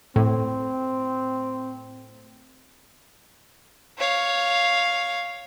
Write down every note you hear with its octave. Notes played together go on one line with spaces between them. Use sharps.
A2 C4
C#5 F5